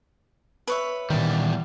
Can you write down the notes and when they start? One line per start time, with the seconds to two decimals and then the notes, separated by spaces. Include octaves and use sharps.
0.67 B4 C#5 E5
1.10 E2 A#2 D#3 G3